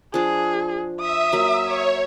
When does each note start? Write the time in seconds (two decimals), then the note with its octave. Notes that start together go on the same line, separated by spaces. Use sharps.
0.14 F3 D4 G#4
1.00 E5 D#6
1.33 F#3 A#3
1.65 C#5